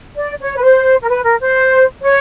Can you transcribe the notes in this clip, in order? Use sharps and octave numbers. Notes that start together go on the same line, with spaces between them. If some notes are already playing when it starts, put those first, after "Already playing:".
D5
C#5
B4
C5
A#4
B4
A#4
C5
C#5